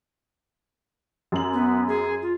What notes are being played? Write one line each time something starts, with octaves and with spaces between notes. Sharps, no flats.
F#2 F#7
B3
G#4
F4